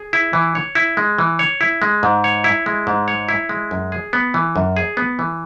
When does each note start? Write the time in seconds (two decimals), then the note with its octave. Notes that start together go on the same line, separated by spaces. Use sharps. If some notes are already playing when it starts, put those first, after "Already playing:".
Already playing: G#4
0.13 E4
0.33 E3
0.55 C#5
0.75 E4
0.97 G#3
1.18 E3
1.39 C#5
1.61 E4
1.82 G#3
2.03 G#2
2.24 C#5
2.44 E4
2.66 G#3
2.87 G#2
3.08 C#5
3.29 E4
3.49 G#3
3.71 F#2
3.92 G#4
4.13 B3
4.34 E3
4.56 F#2
4.77 G#4
4.97 B3
5.19 E3